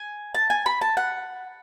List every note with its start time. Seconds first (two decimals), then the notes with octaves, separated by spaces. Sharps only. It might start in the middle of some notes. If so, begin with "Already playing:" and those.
Already playing: G#5
0.34 A5
0.50 G#5
0.66 B5
0.81 A5
0.97 F#5